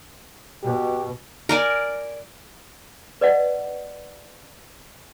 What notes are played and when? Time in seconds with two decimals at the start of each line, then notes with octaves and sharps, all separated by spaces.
0.63 B2 G4
1.49 A#4 D5 G#5
3.21 B4 D5 D#5 F#5